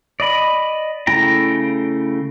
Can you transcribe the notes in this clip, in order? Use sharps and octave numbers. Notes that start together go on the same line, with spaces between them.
D5 D#5 B5
C#3 A3 E4 G5 A#5